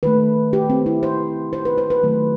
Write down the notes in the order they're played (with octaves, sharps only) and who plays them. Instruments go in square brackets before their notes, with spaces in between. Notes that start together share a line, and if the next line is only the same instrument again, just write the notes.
[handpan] D#3 A3 B4
G4
C4
E4
C5
C5
B4
C5
B4
D#3 F#3 A3